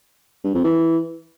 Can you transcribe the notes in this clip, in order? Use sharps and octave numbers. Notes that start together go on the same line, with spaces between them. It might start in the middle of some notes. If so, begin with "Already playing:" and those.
G2
F2
E3